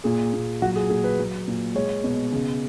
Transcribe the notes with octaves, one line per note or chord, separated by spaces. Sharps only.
A#2 G#4
A#2
F#3 F#4
G#4
A#2 G#4
B4
F#3
A#2
G#3 C#5
B2
C#3